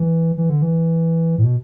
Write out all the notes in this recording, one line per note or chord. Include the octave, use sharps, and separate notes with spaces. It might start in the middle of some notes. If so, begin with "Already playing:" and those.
Already playing: E3
E3
D3
E3
A2
B2